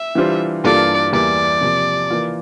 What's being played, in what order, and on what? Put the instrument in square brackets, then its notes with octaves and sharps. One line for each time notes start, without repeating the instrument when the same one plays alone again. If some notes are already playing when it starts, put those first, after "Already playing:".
Already playing: [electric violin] E5
[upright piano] E3 G3 D4 F4 C5
[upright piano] G2 E3 A#3 F4 A4 [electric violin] D5
[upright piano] E2 E3 G3 A#3 E4 [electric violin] D5
[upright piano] C3 F3 A#3
E3 A#3 F4